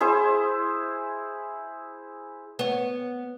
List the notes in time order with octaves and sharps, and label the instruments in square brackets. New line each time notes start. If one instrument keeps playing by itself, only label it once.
[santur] E4 G#4 C5
[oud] B3 C#5